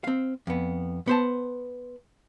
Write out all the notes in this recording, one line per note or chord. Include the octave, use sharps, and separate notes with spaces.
C4 F5
F2 B3
B3 C5 A5